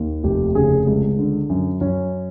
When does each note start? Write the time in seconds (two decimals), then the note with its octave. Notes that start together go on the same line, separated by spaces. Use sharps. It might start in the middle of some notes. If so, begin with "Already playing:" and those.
Already playing: D#2
0.24 F1 G4
0.55 C#3 G#4
0.87 C#2
1.18 D3
1.50 F#2
1.81 F#2 C#4